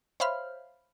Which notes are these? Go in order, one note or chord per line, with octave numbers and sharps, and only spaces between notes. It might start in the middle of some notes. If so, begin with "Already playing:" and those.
C5 C#5 E5 F5 B5 F6